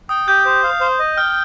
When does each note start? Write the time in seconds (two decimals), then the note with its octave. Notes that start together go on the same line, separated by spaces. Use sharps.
0.09 G5 D#6
0.28 G4 G6
0.45 C5
0.63 F5
0.81 C5
0.99 D#5
1.17 G5 F6